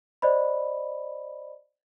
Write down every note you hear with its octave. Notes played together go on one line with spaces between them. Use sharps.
C5 D5 D#5 B5